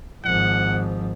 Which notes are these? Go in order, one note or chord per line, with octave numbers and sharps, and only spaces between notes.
G#1 F3 F#5